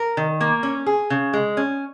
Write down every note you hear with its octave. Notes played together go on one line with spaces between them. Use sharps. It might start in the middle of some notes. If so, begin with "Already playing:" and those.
Already playing: A#4
D#3
A#3
C#4
G#4
C#3
G#3
C#4